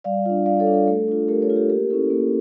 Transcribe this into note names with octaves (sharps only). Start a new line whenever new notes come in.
G3 D5 F5
D4 F4
G3 D5 F5
A4 C#5
D4 F4
A4
A3 A4
D4 F4
A3 G4 A#4
A4 C#5
D4 F4
G4 A#4
A#3 G4 A#4
C#4 E4 A4
A#3